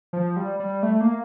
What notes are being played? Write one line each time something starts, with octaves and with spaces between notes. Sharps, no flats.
F3
G3
G3
A3
A#3